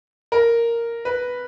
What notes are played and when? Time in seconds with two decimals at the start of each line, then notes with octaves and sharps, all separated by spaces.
0.32 A#4
1.05 B4